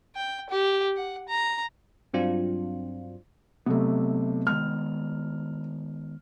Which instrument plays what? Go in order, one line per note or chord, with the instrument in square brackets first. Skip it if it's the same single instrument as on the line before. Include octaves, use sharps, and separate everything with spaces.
[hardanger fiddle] G5
G4
F#5
A#5
[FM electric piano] G2 F#3 C4 D4 F4
[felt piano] C3 A3 [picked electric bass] F#3 B3
[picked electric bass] D#3 G#3 B3 [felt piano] F6